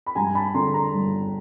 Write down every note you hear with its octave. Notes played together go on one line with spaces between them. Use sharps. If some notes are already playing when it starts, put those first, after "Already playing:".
B5
G2 G#5 A#5
A5 B5
D3 A#5 C6
A#5 C6
G1